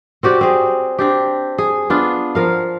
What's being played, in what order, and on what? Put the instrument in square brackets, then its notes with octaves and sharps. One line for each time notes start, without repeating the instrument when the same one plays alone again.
[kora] C4 F#4 G4 D5
C4 G#4
C4 D4 G4
G#4
B3 D4 F4
F3 A#4 F5